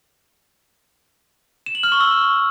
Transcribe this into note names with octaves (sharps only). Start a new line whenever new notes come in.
E7
F#7
F6
C#6
E6